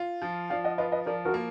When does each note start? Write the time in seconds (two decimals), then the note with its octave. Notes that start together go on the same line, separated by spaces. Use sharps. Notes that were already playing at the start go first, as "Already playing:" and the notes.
Already playing: F4
0.22 F3
0.50 F3 D5 F5
0.64 D#5 F#5
0.78 F4 B4 D#5
0.92 B4 D#5
1.06 F3 A#4 D5
1.25 F#4 A#4
1.34 A#3